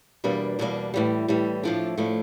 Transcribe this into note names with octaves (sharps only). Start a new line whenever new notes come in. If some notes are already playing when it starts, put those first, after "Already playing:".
E2 B2 G3 A#3 D4
E2 B2 G3 A#3 D4
A2 E3 G3
A2 E3 G3
A2 F3 A3 D4
A2 F3 A3 D4